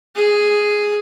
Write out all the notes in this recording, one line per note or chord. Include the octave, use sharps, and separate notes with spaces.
G#4